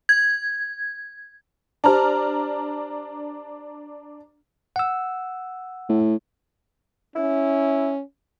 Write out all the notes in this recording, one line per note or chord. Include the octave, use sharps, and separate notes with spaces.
G#6
D4 G4 C5 A5 A#5 F6
F#5 E6
A2
C#4 E4